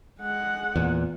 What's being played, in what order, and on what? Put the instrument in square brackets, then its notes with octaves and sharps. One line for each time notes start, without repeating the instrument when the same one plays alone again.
[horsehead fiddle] G#3 F#5
[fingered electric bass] E2 A#2